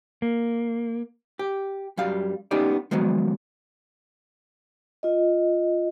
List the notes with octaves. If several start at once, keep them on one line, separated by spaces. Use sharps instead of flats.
A#3
G4
F#2 G3 F5
B3 C#4 D#4 G4 D5
D#3 F3 F#3 G#3 B3
F4 D#5